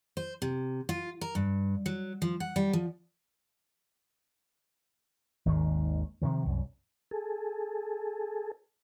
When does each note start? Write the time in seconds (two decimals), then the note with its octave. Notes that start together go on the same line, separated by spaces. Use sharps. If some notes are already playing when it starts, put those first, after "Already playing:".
0.17 C5
0.42 C3
0.89 F4
1.21 A#4
1.35 G2
1.86 F#3
2.22 F3
2.40 F#5
2.56 G3
2.73 F3
5.46 G#1 D#2 G#2 D#3
6.22 C3 D#3 F3
6.45 C2 F#2
7.11 G#4 A4